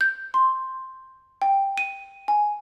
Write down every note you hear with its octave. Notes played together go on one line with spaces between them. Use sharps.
G6
C6
G5
D#7
G#5